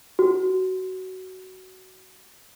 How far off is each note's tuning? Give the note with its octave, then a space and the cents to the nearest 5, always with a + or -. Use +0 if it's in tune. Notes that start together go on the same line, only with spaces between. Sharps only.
F#4 +15